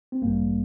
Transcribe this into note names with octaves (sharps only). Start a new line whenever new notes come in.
C4
A1 G2 E3 G3 A#3